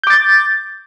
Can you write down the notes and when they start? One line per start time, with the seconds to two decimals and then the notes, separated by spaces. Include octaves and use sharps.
0.04 G6
0.07 D6
0.10 A6